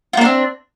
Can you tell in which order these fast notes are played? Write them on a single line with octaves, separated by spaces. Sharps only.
F4 A#3 D4 C4